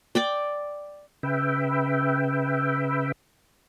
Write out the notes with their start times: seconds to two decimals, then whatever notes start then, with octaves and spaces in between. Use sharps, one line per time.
0.15 D5 G5 D6
1.23 C#3 B4 E5 G5